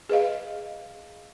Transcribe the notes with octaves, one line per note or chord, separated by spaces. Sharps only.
G#4 B4 D#5 F5